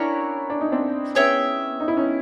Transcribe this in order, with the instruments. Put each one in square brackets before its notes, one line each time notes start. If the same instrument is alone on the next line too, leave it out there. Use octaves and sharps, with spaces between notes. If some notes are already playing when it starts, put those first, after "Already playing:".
Already playing: [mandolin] C#4 F#4 A#4 C#5 [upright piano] D4 E4
[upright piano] D4
D#4
C4 D4
[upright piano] B3 C#4 [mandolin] G#4 C#5 E5 G5
[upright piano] D#4
E4
C#4 D#4